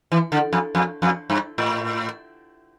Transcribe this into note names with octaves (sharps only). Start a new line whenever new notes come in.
E3
D3
F2
F2
F2
G2
A2